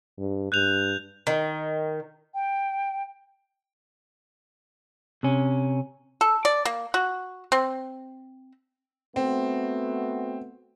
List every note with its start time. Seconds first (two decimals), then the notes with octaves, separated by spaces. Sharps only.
0.18 G2
0.52 G2 F#6 G6 F7
1.27 D#3
2.34 G5
5.23 C3 C#4
6.21 A4
6.45 D5
6.65 A#3
6.94 F#4
7.52 C4
9.16 A3 B3 C4 F#4